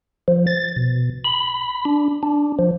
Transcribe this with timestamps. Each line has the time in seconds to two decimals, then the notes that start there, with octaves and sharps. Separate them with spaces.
0.28 F3
0.47 A6
0.76 B2
1.25 B5
1.85 D4
2.23 D4
2.59 F3